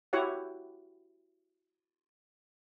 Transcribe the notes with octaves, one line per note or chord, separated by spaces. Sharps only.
E4 F#4 G4 C#5 F#5